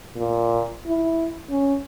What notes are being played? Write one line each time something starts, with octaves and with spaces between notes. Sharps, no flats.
A#2
E4
C#4